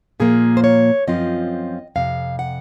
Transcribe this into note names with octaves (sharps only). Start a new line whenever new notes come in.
A#2 F3 A#3 G#4
C5
C#5
F#2 F3 C4 F4 D#5
F2 C3 F5
F#5